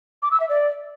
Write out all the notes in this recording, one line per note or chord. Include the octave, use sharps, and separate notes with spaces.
D6
E6
E5
D5